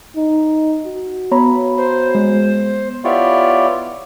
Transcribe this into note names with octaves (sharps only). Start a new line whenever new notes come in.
D#4
F#4
B3 C#5 A#5 B5
C5
G#3
B3 E4 F4 G4 C#5 D5